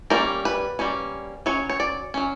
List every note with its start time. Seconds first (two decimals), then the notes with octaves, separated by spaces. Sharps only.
0.10 G3 A#3 C#4 A#4
0.45 B4
0.79 G3 A#3 C#4
1.46 F#3 C#4 C#5
1.70 C#5
1.80 D5
2.14 F#3 C#4